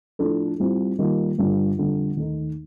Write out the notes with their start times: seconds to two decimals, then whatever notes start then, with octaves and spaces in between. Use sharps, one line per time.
0.19 A2 F3 A3 D4 A4
0.58 A2 G3 C4 F4
0.99 D#3 G3 A#3 F4
1.38 G2 D3 G3 D4 F4
1.77 F2 D3 G3
2.17 D#2 D#3 A3 D#4